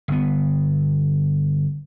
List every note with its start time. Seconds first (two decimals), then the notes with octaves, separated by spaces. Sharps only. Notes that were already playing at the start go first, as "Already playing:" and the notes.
0.08 G1 B3